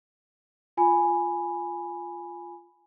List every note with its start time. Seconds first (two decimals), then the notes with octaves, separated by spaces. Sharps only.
0.77 F4 G#5 B5